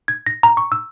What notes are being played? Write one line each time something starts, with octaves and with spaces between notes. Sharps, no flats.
G#6
A#6
A#5
C#6
E6